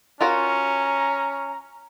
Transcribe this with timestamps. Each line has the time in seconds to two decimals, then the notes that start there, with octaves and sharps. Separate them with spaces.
0.21 C#4 F4 F#4 A#4 A#5